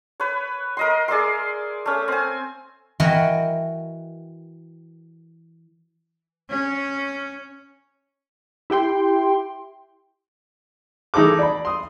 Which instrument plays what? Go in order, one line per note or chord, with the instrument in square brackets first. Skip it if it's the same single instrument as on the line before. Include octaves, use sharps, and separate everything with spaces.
[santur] B4 C#5
A#4 D#5 C6
G#4 D5 E5 C6
A3 C#4
C4 G#5
[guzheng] E3 F#4 A#4 D#5 G5
[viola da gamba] C#4
[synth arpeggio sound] E4 G4 G5 C6
[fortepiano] E3 D#4 G#4 A4 D6
D5 B5
C6 D#6